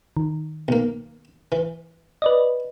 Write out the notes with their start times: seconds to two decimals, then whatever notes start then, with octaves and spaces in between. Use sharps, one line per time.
0.17 D#3
0.68 B1 A#3
1.52 E3
2.22 B4 D5 D#5